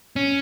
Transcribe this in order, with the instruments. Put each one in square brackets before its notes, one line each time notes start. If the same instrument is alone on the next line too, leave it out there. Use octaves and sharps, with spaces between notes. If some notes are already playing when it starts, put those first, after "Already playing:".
[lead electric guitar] C#4